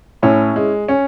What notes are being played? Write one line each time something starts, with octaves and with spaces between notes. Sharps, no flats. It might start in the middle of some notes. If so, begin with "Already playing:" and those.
A2 C#4 E4
G#3
C#4